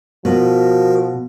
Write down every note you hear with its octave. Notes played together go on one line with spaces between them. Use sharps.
B2 F3 F#4 A#4